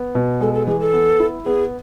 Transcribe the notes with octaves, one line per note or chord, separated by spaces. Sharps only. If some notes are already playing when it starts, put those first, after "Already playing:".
Already playing: B3
B2
G#3 A4
A4
E3 G#4
A4
B3
E4
B3 G#4